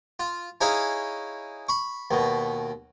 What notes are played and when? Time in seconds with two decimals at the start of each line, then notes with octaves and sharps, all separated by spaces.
0.20 F4
0.61 C#4 D#4 E4 G#4 F5 G#5
1.69 B5 C#6
2.11 D#2 B2